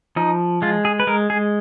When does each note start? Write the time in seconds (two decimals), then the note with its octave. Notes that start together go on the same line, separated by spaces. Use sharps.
0.16 F3 D#4
0.62 G#3 F4
0.85 G#4
1.00 B4
1.07 G#3 A#4
1.30 G#4